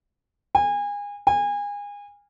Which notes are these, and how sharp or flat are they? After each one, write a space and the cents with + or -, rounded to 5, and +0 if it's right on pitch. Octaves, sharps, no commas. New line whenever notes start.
G#5 -30
G#5 -30